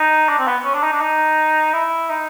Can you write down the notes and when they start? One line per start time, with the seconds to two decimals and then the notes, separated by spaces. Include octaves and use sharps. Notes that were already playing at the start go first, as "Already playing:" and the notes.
Already playing: D#4
0.29 D4
0.39 C4
0.47 B3
0.65 C#4
0.74 D4
0.83 D#4
0.92 D4
1.01 D#4
1.73 E4
2.10 D#4